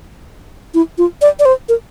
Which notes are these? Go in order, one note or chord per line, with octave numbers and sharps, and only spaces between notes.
E4
F4
D5
D5
C5
A#4